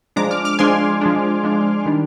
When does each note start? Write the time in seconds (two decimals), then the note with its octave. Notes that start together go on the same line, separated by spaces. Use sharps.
0.16 F3 G#3 D4 A#5 D6
0.31 D6 F6
0.45 D6 F6
0.59 F3 G#3 D4 G#5 C6
1.01 F3 G#3 D4
1.43 F3 G#3 D4
1.86 D#3 G3 D4